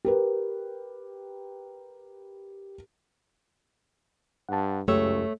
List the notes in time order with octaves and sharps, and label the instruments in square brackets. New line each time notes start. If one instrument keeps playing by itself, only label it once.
[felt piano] G4 A#4 B4
[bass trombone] G2 [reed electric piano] F#5 A5
[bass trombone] C#2 [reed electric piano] F#2 G4 E6 [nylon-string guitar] A3 C#5